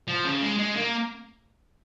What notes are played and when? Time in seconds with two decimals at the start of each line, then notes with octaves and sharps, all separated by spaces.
0.08 F3
0.25 C#3
0.42 G#3
0.59 G#3
0.77 A#3